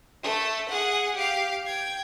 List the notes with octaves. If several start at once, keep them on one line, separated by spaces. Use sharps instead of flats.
A3 A4
G#4 F#5
G4 F5
G5 G#6